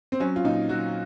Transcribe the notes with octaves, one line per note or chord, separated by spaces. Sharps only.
C4
F#3 C#4
F4
A#2 D#4
F#3 F#4